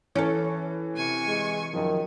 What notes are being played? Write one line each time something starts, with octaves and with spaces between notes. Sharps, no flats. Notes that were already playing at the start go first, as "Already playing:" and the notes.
E3 C#4 A4
C3 G#5 C#6
G#3
F#2 D#3 F3